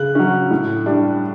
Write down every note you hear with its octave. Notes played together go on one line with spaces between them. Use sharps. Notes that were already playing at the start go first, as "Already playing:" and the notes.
Already playing: C#3 F#6
F#3 C#4
A2
G3 D4